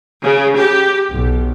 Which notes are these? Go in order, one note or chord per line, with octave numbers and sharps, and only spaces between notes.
C#3
G4
B1